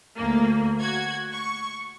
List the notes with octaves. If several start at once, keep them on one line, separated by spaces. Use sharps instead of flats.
D2 A#3
F#4 G#6
C#6